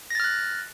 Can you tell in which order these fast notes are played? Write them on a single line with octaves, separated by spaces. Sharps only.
A#6 A6 F6 F#6